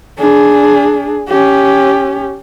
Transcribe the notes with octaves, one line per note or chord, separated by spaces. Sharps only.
D4 G#4
C#4 G4